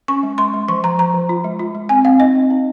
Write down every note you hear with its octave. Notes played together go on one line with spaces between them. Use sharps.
C#4 C#6
G#3
G#3 C6
G#3
F3 C#6
F3 A#5
F3 A#5
F3
F4
G#3
F4
G#3
C4 G#5
C4 F5
D#4 D#5
C4
D#4